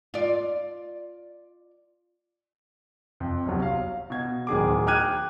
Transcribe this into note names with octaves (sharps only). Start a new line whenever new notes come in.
F4 D5
F2
G1 C2 F#3
F5
B2 G#6
D1 D#3 G#4 D6
G5 D6 F6 F#6 G#6 D#7